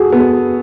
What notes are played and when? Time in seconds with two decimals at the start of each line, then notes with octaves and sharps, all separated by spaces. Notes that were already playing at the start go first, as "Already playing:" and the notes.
Already playing: F#4 G#4 A4
0.12 B3